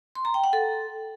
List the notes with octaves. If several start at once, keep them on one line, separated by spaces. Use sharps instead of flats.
C6
A#5
G5
F#5
A4